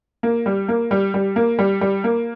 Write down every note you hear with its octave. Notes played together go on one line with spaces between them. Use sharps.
A#3
G3
A#3
G3
G3
A#3
G3
G3
A#3